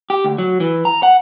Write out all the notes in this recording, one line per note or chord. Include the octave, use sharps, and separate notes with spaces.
G4
D2
F#3
E3
A#5
F#5